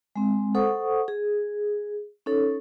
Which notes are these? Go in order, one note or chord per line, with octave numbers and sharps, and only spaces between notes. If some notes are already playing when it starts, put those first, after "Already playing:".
G#3 C4
A4 C5 F#5 C#6 D#6
G#4
C#4 D#4 A4 C#5